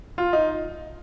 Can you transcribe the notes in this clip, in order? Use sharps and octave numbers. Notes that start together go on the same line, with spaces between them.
F4
D#4